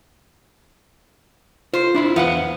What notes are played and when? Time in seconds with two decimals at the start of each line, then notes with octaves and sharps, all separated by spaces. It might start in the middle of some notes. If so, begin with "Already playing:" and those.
1.74 F4 C5
1.95 D4 E4 F4
2.16 E2 B3 F5 F#5